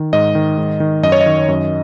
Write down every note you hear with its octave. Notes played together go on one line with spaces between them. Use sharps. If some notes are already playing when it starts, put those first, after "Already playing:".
Already playing: D#3
G#2 D#5
D#3
G#2
D#3
F#2 D#5
C#5
D#5
D#3
F#2